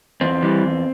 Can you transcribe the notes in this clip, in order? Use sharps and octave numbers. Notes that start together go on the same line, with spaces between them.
E2 C4
E3 G3
E2